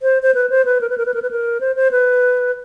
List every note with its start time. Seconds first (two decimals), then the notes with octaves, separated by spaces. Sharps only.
0.02 C5
0.23 C5
0.35 B4
0.50 C5
0.65 B4
0.81 A#4
0.89 B4
0.98 A#4
1.06 B4
1.14 A#4
1.22 B4
1.31 A#4
1.60 C5
1.76 C5
1.91 B4